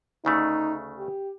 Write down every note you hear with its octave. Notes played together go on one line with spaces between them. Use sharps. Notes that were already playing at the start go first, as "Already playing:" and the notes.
D2 C#3 A3 D#4
G4